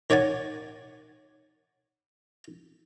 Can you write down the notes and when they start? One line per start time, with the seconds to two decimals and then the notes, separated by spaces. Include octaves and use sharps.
0.10 D#3 C#5 D5 F#5 G#5